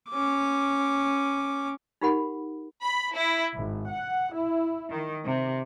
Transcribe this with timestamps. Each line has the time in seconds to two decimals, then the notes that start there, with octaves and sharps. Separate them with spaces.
0.11 C#4 D6
2.01 D#4 F4 G4 A#4 F#5 B5
2.83 B5
3.13 E4
3.54 G#1
3.89 F#5
4.33 E4
4.91 D#3
5.25 C3